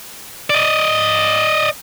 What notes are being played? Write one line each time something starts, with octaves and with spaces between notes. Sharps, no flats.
D5 D#5